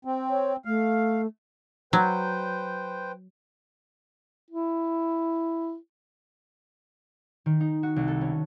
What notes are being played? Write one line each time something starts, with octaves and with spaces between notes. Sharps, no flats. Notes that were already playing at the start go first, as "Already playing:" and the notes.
C4
C#5
A3 F5
F#3 B4 C5 G5
E4
D#3
D#4
F#4
C2
A4
C#4